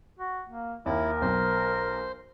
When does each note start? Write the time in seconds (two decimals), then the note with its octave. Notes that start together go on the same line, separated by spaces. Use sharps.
0.20 F#4
0.49 A#3
0.86 D#2 E4 A#4
1.22 B1 C5